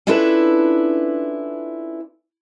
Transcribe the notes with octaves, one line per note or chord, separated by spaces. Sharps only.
C#4 D4 E4 F4 A4 B4